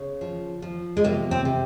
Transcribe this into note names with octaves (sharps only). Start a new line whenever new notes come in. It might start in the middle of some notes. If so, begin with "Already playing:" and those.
Already playing: C#3
F3
F3
G#3
C3 A#3
C4
C3